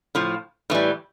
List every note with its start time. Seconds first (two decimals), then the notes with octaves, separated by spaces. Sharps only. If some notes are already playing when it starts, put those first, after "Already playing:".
0.15 A2 F3
0.70 A2 E3 G3